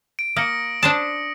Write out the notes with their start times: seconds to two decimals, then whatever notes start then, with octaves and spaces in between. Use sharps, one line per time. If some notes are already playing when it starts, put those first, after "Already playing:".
0.19 D7
0.36 A#3 D#6 A#6 C#7
0.83 D4 C5 A5 D#6